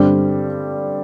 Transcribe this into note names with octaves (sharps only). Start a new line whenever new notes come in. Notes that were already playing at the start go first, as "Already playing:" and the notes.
Already playing: G2 D3 G3 C4